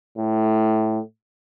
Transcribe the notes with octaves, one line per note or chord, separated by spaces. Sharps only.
A2